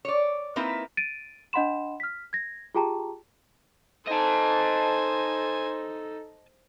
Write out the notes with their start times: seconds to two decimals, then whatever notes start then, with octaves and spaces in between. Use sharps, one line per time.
0.05 C#5 D5
0.56 A#3 C4 D#4 E4 A#4 B4
0.97 A6 D7 D#7
1.53 D4 D#5 F#5 B5 C6 E7
2.00 F6 B6
2.33 G#6 A#6
2.75 F4 G4 G#4 G5 A5 A#5
4.07 D#4 A4 C5 D#5 G#5 A5